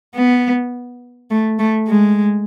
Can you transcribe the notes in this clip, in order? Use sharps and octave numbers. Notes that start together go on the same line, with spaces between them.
B3
A3
A3
G#3